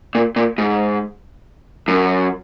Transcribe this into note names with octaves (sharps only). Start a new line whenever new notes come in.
A#2
A#2
G#2
F#2